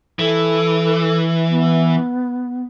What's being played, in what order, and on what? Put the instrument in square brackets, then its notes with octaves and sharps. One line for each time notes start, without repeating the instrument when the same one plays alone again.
[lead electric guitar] E3 [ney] A4
[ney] B3